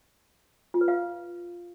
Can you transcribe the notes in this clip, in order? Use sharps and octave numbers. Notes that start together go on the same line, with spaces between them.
F4
B4
F5